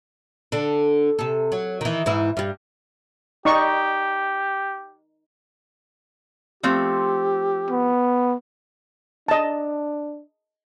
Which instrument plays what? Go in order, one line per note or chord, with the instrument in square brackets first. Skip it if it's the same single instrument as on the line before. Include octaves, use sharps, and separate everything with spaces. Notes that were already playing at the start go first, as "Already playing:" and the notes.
[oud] D3 D4
C3 A4
F#3
D#3 E3
G#2 E3 E4
G2 G3
[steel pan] D#4 D5 C#6 [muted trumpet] G4
[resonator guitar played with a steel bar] F3 A3 C4 [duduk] G4
[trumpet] B3
[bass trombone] D4 [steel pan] D#5 A5